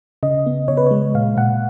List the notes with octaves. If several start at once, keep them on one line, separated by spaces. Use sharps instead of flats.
C#3 D#5
B3
C#3 C#5
B4
G#3 C#5
A#2 F5
A#2 F#5